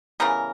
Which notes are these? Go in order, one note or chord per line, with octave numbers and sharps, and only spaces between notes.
C#3 E3 G3 B3 A#4